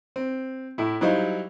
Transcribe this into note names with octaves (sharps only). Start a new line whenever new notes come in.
C4
A2 E4
F#3 G3 D#4 E4 C5 F5